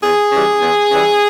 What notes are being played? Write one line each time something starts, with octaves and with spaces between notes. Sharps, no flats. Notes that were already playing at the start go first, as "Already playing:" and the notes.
E2 G#4
C#3 E3 G3
E2
C#3 E3 G3